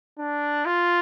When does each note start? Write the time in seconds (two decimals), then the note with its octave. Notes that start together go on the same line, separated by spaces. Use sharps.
0.19 D4
0.66 F4